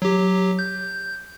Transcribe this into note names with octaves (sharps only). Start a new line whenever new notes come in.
F#3 G4
G6